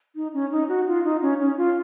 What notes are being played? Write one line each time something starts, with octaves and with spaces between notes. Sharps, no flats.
D#4
C#4
D#4
F#4
F4
D#4
C#4
C#4
F4